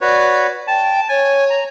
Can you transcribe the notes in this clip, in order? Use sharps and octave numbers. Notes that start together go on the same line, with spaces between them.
F#4 B4 C#5 D5
G5 A5
C#5 G#5
A#5